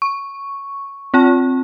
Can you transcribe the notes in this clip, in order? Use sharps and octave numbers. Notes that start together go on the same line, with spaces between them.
C#6
C4 F4 A5